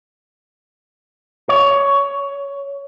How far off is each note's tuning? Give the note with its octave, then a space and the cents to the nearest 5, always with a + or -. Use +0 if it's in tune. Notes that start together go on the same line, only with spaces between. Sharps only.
C#5 +15